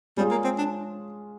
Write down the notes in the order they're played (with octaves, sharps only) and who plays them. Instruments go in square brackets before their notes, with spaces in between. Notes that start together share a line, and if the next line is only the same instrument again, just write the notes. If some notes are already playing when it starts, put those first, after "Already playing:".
[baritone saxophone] G3 [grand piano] G#3 C#4 F4 G#4
[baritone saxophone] A#3
C4
D4